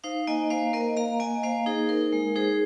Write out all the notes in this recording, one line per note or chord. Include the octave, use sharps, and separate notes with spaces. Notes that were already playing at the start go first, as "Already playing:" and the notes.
D#4 C5 F5
A#3 D#5 G#5
A#3 C5 F5
A#3 A#4 D#5
A#3 F5 A#5
A#3 D#5 G#5
A#3 C5 F5
D#4 G#4 C5
D#4 A#4
G#3
D#4 G#4 C5